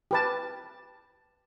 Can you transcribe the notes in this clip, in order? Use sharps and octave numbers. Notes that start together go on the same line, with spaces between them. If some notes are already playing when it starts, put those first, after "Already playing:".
G4 B4 A5